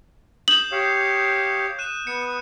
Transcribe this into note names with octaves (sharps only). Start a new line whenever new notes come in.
D#6 G6 E7 F#7
G4 C#5 F5
F#6 D#7 E7
B3 C#7